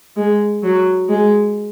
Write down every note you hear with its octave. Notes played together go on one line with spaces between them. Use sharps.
G#3
F#3
G#3